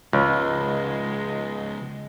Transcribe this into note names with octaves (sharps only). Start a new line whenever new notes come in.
C#2 C#3 F3 G#3